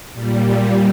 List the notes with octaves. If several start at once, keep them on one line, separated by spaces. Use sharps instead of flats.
A#2 G3